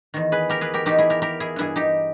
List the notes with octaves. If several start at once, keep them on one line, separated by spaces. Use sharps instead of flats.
E2 D#3
G#4 B4
G4 A#4
G#4 B4
G4 A#4
E2 D#3 D#4 G4
E4 G#4
G4 A#4
G4 A#4
E4 G#4
G2 E3 E4 G#4
D#4 G4